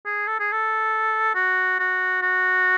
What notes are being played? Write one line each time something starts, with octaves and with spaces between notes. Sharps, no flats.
G#4
A4
G#4
A4
F#4
F#4
F#4